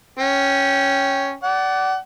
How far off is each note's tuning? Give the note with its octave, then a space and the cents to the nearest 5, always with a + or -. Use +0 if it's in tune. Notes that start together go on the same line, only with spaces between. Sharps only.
C#4 +0 G5 +0
D5 -15 F#5 +30